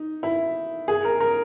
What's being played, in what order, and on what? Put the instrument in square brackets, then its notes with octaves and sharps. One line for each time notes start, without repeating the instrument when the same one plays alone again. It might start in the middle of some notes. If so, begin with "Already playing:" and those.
Already playing: [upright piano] D#4
E4
G#4
A#4
A#4